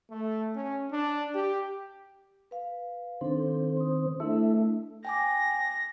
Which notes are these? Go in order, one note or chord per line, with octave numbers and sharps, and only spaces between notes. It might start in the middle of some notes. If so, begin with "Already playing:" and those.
A3
C#4
D4
G4
B4 F5
D#3 C4 D4 A4 C5
C6 D#6
A3 D4 E4 A4 E5
G5 G#5 D6 A#6